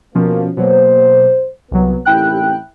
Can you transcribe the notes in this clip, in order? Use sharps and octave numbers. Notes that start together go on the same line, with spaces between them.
B2 F3 A#3 C#4
B2 F#3 A#3 C5
C2 F#3 B3
A1 D#2 C3 E4 G5 F#6